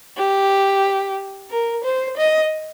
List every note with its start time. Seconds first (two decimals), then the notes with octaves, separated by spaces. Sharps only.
0.17 G4
1.50 A#4
1.84 C5
2.17 D#5